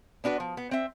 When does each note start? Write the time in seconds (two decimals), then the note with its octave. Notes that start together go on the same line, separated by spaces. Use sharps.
0.24 B3 D4 F#4 B4
0.40 F3
0.57 B3
0.71 C4 E5